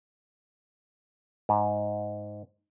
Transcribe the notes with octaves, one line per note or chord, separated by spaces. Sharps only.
G#2